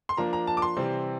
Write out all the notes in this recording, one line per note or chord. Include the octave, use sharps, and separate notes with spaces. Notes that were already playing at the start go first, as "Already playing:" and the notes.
C6
F3 A#3 D4 A#5
A#5
A5
D6
C6
C3 E3 G3 C4